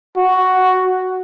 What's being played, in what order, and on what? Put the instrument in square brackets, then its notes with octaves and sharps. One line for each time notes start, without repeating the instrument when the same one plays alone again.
[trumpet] F#4